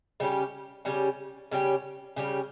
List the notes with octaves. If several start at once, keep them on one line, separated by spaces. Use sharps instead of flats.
C#3 G3 C#4 G4
C#3 G3 C#4 G4
C#3 G3 C#4 G4
C#3 G3 C#4 G4